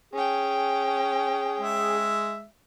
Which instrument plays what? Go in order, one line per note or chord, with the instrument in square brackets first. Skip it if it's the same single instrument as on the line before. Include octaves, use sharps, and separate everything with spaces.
[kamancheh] C#4 G5 [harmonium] G#4
[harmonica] G#3 E5